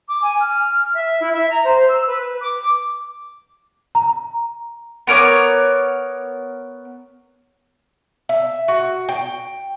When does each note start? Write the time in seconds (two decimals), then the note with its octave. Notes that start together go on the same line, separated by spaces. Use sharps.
0.07 D6
0.22 G#5
0.39 F6
0.94 E5
1.20 E4
1.33 E5
1.49 A#5
1.63 C5
1.88 E6
2.05 B4
2.41 D6
3.95 A#5
5.07 B3 A#4 C#5 D6
8.29 E5
8.68 F#4
9.09 G5